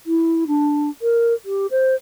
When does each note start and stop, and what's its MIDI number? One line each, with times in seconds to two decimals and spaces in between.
0.06 0.44 64
0.47 0.89 62
1.01 1.33 70
1.45 1.66 67
1.70 1.94 72